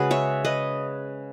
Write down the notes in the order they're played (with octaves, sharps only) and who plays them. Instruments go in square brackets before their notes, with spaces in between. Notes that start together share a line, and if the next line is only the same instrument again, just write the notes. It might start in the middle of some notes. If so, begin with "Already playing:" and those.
Already playing: [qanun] C#3 G#3 C#4 F#4 G#4 B4
C#5 E5
B4 D#5